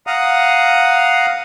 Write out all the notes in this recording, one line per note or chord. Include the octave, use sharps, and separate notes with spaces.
F5 F#5 A#5 D#6